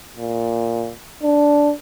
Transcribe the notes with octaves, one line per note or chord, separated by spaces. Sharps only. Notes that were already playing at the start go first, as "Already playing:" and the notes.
A#2
D4